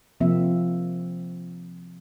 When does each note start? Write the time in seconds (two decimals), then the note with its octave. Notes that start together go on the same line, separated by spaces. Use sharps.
0.20 C3 F3 A#3 C4 E5